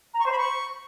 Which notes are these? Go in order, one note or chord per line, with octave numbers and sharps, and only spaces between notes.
A#5
C#6
C5
B5
C#6